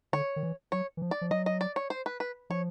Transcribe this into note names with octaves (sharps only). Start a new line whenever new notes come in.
D3 C#5
D#3
E3
F#3 C#5
E3
F3
D5
F3
F#3 D#5
D#5
D5
C#5
C5
B4
B4
F3 C#5